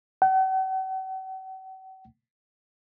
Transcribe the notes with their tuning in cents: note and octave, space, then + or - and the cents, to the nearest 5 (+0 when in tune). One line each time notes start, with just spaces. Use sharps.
F#5 +45